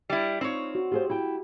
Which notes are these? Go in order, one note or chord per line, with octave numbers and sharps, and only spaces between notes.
G3 E4
C4 D#4 F4 C#5
F#4
F4 G4 G#4 C5
E4 G5